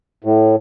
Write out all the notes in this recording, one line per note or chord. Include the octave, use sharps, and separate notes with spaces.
A2